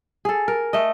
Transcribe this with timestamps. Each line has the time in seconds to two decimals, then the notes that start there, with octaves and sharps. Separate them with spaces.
0.25 G#4 A4
0.48 A#4
0.73 A3 D#5